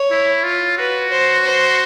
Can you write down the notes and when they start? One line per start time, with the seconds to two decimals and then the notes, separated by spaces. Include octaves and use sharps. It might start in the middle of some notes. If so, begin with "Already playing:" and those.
Already playing: C#5
0.11 E4
0.44 F4
0.78 F#4 B4
1.11 C5
1.44 C5